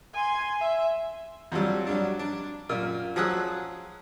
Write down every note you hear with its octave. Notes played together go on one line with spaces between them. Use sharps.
G#5 C6
E5
F2 F#3 G3
F#3 G3 D4
D4
F#2 A#2
F3 F#3 G#4 D#6 E6 F#6